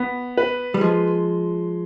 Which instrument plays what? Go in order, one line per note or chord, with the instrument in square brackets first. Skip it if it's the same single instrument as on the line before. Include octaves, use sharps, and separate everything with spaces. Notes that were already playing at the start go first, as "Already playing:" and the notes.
Already playing: [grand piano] B3
B4
[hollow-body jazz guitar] G3
[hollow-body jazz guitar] F3 [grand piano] G#3